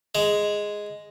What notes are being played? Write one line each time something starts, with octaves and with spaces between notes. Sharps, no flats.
G#3